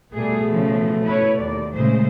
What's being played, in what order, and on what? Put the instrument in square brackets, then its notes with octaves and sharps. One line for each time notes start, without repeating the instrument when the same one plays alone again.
[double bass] B2 A3 [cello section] G3 G#4
[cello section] C#3 F3
E4 B4 C#5
D#2 D5
[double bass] A#2 C#3 [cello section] G#3 A3 C5